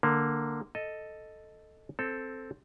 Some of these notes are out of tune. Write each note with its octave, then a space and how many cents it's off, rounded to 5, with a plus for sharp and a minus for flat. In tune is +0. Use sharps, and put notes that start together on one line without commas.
D3 +15 A#3 +0
A4 +0 D#5 +0
C4 +0 A4 +0